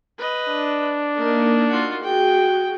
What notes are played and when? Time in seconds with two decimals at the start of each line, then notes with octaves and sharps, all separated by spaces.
0.18 B4 D#5
0.49 D4
1.17 A#3 D#4 A#4
1.69 F4 F#4
2.03 F#4 G#4 G5